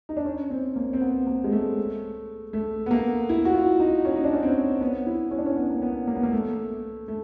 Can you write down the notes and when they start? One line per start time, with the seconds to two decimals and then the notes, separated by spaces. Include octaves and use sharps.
0.09 D#4
0.17 D4
0.25 C#4
0.50 C4
0.76 A#3
0.93 C4
1.01 B3
1.27 A#3
1.44 G#3
1.52 A3
2.53 A3
2.86 B3
2.91 A#3
3.29 E4
3.45 F#4
3.54 F4
3.80 D#4
4.05 C#4
4.16 D#4
4.24 D4
4.33 C#4
4.43 C4
4.81 B3
5.06 E4
5.31 C#4
5.38 D4
5.46 C#4
5.56 B3
5.70 A#3
5.82 B3
6.07 A#3
6.15 B3
6.23 A#3
6.33 A3
7.08 A3